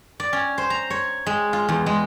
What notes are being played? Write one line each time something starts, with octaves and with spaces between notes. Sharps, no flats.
D5
C#4
C5
A#5
C#5
G#3
F4
E2
G#3